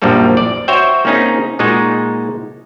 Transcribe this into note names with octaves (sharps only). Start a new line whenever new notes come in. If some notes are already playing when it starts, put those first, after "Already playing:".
A#1 F#2 F3 G3 A#3 A4
D5
F#4 C5 C#5 E5 G5
A#3 C4 C#4 D#4 G#4
A#2 G#3 D#4 F#4 G#4